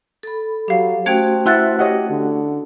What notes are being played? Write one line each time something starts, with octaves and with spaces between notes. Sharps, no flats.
A4 B5
F#3 G4 F5
A3 C#4 F#4 C5 G5 G#6
E4 E5 F#5 C6 F#6 A6
G4 C#5 D#5 F#5
D3